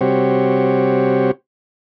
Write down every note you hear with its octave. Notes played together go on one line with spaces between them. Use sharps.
C3 G3 C4 F#4 G4 C#5